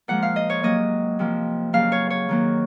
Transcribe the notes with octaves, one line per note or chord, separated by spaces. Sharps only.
A#2 F3 G#3 F#5
F5
D#5
C#5
C3 F#3 A#3 D#5
C3 F3 A#3
C#3 F#3 A#3 F5
C#5
C#5
D#3 F#3 A#3